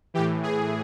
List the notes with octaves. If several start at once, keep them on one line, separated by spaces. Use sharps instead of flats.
A2 E3 G4
G#4